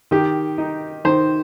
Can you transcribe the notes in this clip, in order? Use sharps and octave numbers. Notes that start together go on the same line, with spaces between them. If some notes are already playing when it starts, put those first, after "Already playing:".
D#3 G4
D#4
D#3 C5